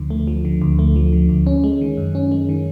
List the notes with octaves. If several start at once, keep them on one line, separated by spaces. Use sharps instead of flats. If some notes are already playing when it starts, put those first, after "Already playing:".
Already playing: D2 D3 F3
A3
F3
D3
D2
A3
F3
D3
D2
C#4
G#3
D#3
F#2
C#4
G#3
D#3